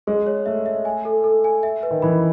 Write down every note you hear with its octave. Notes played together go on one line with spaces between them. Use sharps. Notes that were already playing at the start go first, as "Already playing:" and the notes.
G#3 G#4
C#5
A3 E5
E5
G#5
A4
A4
G#5
E5
B4
D#3
E3 B5